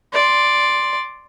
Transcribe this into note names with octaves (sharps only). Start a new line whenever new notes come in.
D5 C6